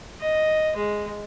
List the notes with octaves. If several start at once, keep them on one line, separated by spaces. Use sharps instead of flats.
D#5
G#3